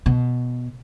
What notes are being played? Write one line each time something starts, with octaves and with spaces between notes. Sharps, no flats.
B2